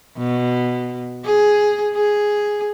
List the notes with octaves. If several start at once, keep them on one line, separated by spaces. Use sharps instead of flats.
B2
G#4
G#4